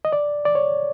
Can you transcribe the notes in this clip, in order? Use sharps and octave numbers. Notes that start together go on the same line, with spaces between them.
D#5
D5
D5
C#5